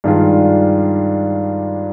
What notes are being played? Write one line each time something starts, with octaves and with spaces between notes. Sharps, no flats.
G2 D#3 G#3 D4 F4